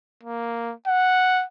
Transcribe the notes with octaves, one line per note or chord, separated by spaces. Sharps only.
A#3
F#5